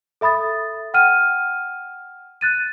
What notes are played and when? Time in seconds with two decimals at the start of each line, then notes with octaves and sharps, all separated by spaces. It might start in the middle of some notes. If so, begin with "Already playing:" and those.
0.21 A4 E5 B5 D#6 A6
0.94 F#5 G5 F6 D#7
2.41 F#6 A6 D#7